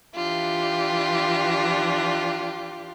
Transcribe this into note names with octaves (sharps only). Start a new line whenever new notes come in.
E3 D4 F4 G4